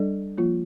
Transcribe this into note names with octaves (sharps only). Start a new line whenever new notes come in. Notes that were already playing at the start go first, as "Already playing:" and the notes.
Already playing: G3 D4 A4 D5
F3 A#3 F4